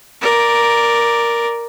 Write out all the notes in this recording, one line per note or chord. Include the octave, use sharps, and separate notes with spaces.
A#4 D5